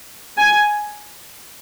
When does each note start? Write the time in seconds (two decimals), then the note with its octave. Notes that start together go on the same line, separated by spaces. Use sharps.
0.38 G#5